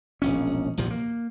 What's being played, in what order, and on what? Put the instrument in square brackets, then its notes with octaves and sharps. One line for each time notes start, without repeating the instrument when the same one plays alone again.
[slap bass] E1 A#1 C#4
A#1 E2 C3 F3
A#3